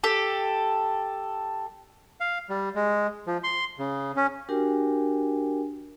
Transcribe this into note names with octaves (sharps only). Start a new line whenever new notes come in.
G4 A4
F5
G3
G#3
F3
C6
C#3
C#4
D4 F#4 G4 A#4 G5 G#5